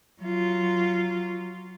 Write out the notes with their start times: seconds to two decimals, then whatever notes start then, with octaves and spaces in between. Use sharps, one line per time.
0.22 F#3 F4